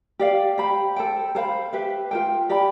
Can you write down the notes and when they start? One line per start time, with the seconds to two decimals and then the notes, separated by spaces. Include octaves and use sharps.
0.19 G4 D5 F5
0.58 G4 C5 G5 B5
0.96 A4 C5 G5
1.35 A4 C5 F5 B5
1.73 G4 B4 E5
2.11 F4 C5 G5
2.49 G4 D5 G5 B5